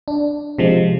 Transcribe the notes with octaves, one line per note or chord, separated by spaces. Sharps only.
D4
C3 F3 G#3